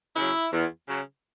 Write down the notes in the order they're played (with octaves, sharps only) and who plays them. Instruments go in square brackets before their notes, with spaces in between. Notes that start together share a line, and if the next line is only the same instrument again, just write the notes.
[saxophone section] C#3 F#3 E4
E2
C#3 F#3